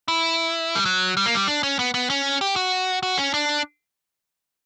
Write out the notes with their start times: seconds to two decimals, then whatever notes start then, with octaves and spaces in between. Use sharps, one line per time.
0.08 E4
0.75 G3
0.85 F#3
1.17 G3
1.26 A#3
1.35 G3
1.48 D4
1.63 C#4
1.79 B3
1.94 B3
2.10 C#4
2.41 G4
2.56 F#4
3.03 F#4
3.18 C#4
3.34 D4